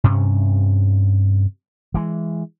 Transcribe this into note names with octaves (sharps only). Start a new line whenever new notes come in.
G2 C3 C#4
E3 G#3